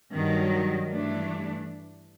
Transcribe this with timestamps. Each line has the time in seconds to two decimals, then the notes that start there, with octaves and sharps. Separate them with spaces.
0.12 G2 D#3 F#3
0.88 G2 E3 A3 D4